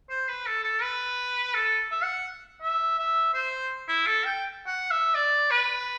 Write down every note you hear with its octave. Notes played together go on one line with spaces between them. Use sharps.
C5
B4
A4
A4
B4
A4
E5
F#5
E5
E5
C5
E4
A4
G5
F#5
E5
D5
B4